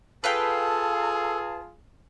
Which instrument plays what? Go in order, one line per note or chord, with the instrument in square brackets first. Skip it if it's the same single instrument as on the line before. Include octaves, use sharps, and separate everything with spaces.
[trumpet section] F4 G#4 [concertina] A4 [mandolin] B4 F5 G5 [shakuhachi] A5